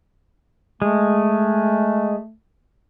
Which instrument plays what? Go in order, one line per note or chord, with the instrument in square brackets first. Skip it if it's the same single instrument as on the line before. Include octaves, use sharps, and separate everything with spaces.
[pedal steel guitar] G#3 [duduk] A3